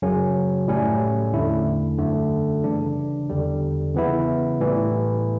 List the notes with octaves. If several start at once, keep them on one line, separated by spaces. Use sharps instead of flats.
F#2 C#3 F#3 C#4
A2 G3 C#4
E2 D3 A3 E4
F#2 D3 A3
C#3 E3 G3 D4
E2 D3 G3
C#3 E3 B3 E4
A2 E3 G3